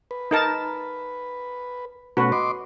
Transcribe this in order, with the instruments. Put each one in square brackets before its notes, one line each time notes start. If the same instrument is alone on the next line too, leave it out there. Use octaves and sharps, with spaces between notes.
[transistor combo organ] B4
[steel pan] D#4 A#4 A5
[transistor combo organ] B2 A3 C#4 [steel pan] F#4 B4
[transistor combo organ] D#5 C6 D6